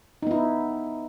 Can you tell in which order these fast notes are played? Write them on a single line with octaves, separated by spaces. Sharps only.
D#4 B3 E4